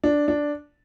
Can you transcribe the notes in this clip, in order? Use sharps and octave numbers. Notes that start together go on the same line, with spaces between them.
D4
D4